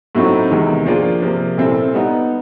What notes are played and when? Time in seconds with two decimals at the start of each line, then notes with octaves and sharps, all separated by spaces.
0.15 A2 F#3 A3 C4 D#4
0.50 E2 C3 D#3 G#3
0.86 F3 A#3 D4 F4 G#4
1.22 C3 F3 A#3
1.57 A#2 G3 C4 E4 A4
1.94 G3 B3 D#4